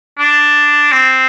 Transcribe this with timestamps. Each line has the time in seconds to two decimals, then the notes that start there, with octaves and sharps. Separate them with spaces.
0.18 D4
0.92 C4